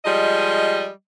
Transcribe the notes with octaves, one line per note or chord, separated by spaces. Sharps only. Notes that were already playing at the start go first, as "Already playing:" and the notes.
F3 G3 G#3 D#5